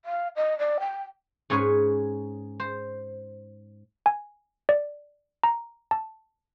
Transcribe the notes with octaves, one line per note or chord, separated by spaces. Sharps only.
F5
D#5
D5
G5
G#2 C#4 G#4 B4 C#5
C5
G#5
D5
A#5
A5